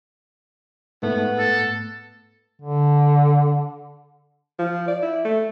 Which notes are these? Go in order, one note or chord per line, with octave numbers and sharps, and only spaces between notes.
G#2 A3 B3
A4
D3
F3
D5
E4
A3